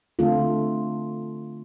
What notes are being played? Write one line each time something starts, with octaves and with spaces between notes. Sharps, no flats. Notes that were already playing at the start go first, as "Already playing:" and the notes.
D3 A3 C4 F4 A4